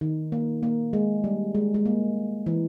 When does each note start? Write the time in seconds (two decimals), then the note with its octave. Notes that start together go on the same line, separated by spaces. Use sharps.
0.01 D#3
0.32 A#3
0.63 A#3
0.93 G#3
1.24 G3
1.55 G#3
1.74 G#3
1.85 A#3
2.46 E3